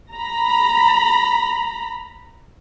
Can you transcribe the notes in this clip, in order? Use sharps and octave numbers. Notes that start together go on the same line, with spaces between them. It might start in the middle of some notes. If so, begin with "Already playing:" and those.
A#5 B5